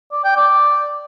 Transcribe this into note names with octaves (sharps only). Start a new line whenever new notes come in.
D5
G5
D5